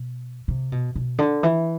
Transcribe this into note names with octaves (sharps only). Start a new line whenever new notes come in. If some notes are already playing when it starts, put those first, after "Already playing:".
Already playing: B2
C3
B2
B2
D3
E3